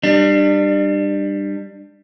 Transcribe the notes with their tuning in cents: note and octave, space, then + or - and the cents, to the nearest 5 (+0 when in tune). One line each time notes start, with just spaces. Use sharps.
G3 +5 D4 +30